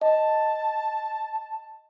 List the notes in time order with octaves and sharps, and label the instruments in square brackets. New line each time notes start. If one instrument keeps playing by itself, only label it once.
[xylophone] D#5 [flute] A5